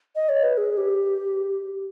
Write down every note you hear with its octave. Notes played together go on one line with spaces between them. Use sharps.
D#5
C#5
B4
G#4
G4